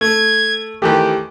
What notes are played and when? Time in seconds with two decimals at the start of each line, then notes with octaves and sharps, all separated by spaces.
0.01 A3 G#6
0.82 D#3 E3 A3 G4